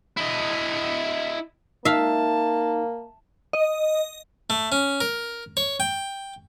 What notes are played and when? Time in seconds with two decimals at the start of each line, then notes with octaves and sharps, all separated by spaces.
0.17 E4 D#5
1.85 A#3 D#4 E5 F5 A5
3.53 D#5
4.50 A3
4.72 C#4
5.01 A#4
5.57 C#5
5.80 G5